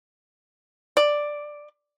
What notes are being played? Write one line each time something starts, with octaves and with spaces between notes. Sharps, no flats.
D5